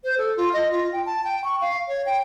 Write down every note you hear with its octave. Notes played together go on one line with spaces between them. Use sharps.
C5
A4
F4
D#5
F4
G5
A5
G5
C#6
F5
C#5
G5